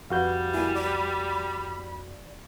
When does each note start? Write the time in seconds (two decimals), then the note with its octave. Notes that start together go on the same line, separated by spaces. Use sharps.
0.10 F2 G3 F#4 B4 F5 G6
0.54 A#3 E4 G#5
0.75 D5 B5